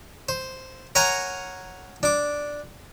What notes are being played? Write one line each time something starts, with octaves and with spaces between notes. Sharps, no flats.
C5
A#4 C#5 F#5 G#5 A#5
D4 D6